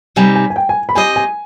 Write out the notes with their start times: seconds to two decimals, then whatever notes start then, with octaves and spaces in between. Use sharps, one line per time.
0.16 C3 G3 C4 D#4 G#5
0.35 G#5
0.50 G#5
0.56 G5
0.69 G#5
0.89 B5
0.95 C4 G4 C5 D#5 G#5
1.16 G#5